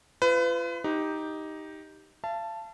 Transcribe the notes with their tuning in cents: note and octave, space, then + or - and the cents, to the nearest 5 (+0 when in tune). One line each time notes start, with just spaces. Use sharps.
F4 -35 B4 +30
D#4 +5 G4 +0
F5 -45 A5 +0